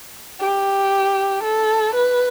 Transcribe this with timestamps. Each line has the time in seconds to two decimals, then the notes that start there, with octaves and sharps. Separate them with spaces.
0.40 G4
1.43 A4
1.94 B4